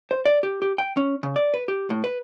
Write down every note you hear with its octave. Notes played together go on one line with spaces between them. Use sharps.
C5
D5
G4
G4
G5
C#4
C#3
D5
B4
G4
A2
B4